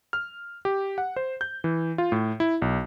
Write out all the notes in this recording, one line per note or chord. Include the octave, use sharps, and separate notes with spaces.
F6
G4
F#5
C5
G6
E3
F4
A2
E4
B1